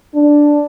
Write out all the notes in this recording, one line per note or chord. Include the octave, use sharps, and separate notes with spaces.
D4